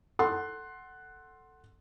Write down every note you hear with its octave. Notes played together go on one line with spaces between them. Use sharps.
A4 F#5 C6